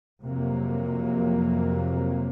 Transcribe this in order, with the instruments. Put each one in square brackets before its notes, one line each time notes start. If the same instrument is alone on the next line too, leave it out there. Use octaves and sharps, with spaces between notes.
[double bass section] F2 C3 F#3 A#3